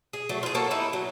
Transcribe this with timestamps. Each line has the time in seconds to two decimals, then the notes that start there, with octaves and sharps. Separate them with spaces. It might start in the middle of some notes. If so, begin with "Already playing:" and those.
0.13 G#4
0.29 F#3 A3
0.43 F4 G#4
0.55 A#3 F#4 A4 C#5
0.71 D#4 E4
0.93 F#3